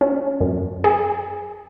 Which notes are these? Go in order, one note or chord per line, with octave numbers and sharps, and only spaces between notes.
C#4
F#2
G#4